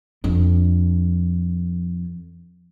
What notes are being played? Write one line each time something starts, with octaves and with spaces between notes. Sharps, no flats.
F2 D4